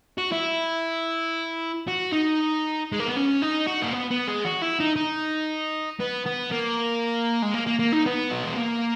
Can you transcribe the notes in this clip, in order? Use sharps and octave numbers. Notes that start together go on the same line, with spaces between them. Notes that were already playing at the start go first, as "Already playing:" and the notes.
F#4
E4
F#4
D#4
G#3
A#3
B3
C#4
D#4
F#4
A#3
B3
B3
G#3
F#4
E4
D#4
D#4
B3
B3
A#3
G#3
A#3
A#3
A#3
D#4
B3
F#3
G#3
A#3